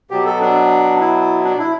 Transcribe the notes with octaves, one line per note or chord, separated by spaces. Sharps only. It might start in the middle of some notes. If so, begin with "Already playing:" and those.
B2 F#3 G4
A4
D4
E4
D4
E4